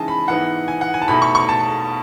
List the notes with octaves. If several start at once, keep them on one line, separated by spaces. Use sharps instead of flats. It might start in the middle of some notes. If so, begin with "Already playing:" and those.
Already playing: C#3 E3 G#3 D#4 G#5 A5
B5
G#2 E3 B3 D#4 F#5
G#5
F#5
G#5
A5
E2 B2 A3 D#4 B5
C#6
C#6
A5